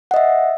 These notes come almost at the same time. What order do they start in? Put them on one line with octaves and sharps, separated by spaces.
F#5 D#5 E5